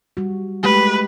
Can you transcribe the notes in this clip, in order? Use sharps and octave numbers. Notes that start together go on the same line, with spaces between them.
G3 F#4
G#3 A3 G4 B4